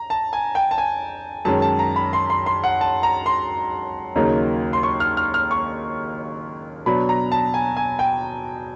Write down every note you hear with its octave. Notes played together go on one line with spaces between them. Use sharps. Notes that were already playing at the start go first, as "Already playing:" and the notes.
Already playing: A#5
A5
G#5
G5
A5
G#5
F#2 D#3 G#3 C#4 A5
A5
A#5
B5
C6
C6
C6
F#5
A5
A#5
C6
D#2 C#3 F#3 A#3 D#4
C6
C#6
F6
F6
F6
C#6
B2 F#3 B3 D4 B5
A#5
A5
G#5
G#5
G5